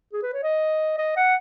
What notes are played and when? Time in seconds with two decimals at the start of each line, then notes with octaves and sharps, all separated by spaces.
0.13 G#4
0.23 B4
0.34 C#5
0.43 D#5
0.98 D#5
1.16 F#5